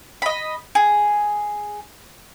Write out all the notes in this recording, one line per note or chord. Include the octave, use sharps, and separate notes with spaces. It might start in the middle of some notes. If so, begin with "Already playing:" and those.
D#5 B5
G#4